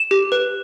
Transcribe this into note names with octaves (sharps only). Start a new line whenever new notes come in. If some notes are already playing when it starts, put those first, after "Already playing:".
Already playing: E7
G4
B4